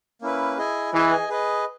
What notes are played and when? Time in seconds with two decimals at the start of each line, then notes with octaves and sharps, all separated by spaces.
0.22 A#3 C#4 E4 B4
0.58 E4 G#4 D#5 G#5
0.93 E3 G#4 D#5 G#5
1.29 G#4 B4 D#5